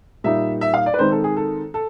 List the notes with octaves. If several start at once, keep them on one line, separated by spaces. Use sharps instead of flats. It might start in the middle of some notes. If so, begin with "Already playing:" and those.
A#2 G3 A#3 D#4 E5
E5
F5
D5
B4
D#3 G#3 C4 D#4 C5
A4
G#4
A4
A4